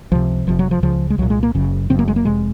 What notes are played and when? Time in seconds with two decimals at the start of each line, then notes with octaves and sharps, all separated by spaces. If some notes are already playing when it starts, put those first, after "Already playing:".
0.12 C#2 C3 F3
0.47 F1 F2 C3 F3
0.59 F#3
0.71 F3
0.82 C#2 C#3 F3
1.10 G#3
1.18 C2 A#2 F#3
1.30 G#3
1.43 A#3
1.55 F#1 F#2 C#3
1.90 F#1 F#2 C#3 C4
1.99 A#3
2.08 G#3
2.16 A#3
2.25 F1 F2 C3 G#3